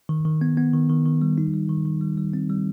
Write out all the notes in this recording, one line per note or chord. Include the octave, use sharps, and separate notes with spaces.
D#3
D#3
B3
B3
D#3
D#3
D#3
G3
D#4
G3
D#3
D#3
G3
G3
C4
G3